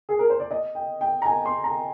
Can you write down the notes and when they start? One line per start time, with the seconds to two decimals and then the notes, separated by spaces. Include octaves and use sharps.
0.09 G#4
0.19 A#4
0.30 C5
0.40 D5
0.51 D#5
0.75 G5
1.01 G5
1.22 A#5
1.26 G#5
1.45 C6
1.64 A#5